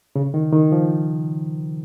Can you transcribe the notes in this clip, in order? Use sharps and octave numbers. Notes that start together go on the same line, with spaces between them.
C#3
D#3
D#3
F3